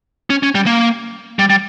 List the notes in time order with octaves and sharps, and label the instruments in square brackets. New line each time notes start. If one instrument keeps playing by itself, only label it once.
[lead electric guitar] C#4
C#4
G3
A#3
G3
G3